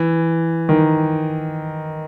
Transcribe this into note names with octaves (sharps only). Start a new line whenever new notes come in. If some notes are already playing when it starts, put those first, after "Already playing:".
Already playing: E3
D#3